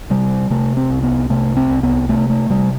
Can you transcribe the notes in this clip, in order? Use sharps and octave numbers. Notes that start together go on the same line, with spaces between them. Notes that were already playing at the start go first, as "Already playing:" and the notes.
C3 G3
C3 A3
C4
C2
B3
C3 A3
C4
C2
B3
C3 A3
A3
C3 G3